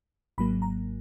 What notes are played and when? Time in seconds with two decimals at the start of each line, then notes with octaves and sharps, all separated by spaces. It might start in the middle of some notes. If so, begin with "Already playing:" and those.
0.38 G#1 G#2 F#3 A#3 B5
0.62 A#5